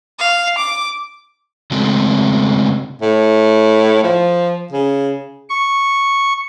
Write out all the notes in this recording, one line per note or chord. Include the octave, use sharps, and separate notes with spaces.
F5
D6
C#3 G#3 A3 C4 F#4
A2
F3
C#3
C#6